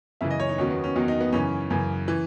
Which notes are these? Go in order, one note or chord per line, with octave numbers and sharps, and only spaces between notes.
F#2 C#3 E3 E5
D#5
C#5
D#4
E2 D#3 F#3 C#4
B3
C#4
E2 D#3 F#3 D#4
D#4
B3
F#2 C#3 E3 C#4
F#2 C#3 E3
E3